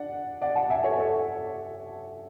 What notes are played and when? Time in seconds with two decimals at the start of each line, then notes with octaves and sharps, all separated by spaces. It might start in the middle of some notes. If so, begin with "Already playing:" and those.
Already playing: D4 D5 F#5
0.42 D5 F#5
0.56 F#5 A5
0.70 E5 G#5
0.84 A4 C#5
0.98 A4 C#5